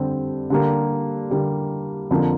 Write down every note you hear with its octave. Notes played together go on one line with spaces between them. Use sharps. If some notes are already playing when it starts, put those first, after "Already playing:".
Already playing: D3 G3 C4
D3 G3 A#3
D3 G3 A#3
F2 D3 F3 A#3